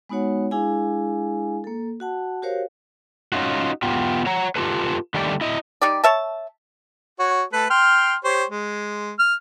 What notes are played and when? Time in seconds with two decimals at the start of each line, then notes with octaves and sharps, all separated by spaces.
0.09 G#3 B3 D#4 F#4 C#5 F#5
0.51 G#3 D4 E4 G#4 F5 G#5
1.64 A#3 A4
2.00 F#4 F#5 A5
2.42 F#4 G4 A#4 C5 C#5 F5
3.32 C#4 D#4 F4 F#4
3.83 B3 F4 G4
4.26 C#5 F#5 A#5
4.56 F4 G4 A4 B4
5.14 D3 D#3 G3 A3 G4 D5
5.41 E4 D#5
5.82 G3 D#4 G4 D5
6.04 C#5 E5 A5
7.19 F#4 C#5
7.53 A3 A4 B4
7.70 G5 C6 F6
8.24 G4 C5 C#5
8.50 G#3
9.19 F6